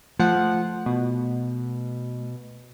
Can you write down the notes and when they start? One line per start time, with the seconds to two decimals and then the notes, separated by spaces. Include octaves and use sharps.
0.19 F3 A3 F#5
0.86 B2